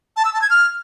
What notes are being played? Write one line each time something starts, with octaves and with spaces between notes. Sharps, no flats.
A5
E6
A5
G#6
F6